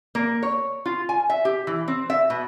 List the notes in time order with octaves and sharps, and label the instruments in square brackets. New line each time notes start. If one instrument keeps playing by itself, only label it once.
[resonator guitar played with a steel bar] A#3
C#5
F4
G#5
E5
G4
E3
C4
E5
B2